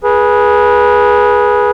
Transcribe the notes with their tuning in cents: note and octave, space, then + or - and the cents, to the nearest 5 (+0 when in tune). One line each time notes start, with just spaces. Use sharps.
G#4 +0 B4 -20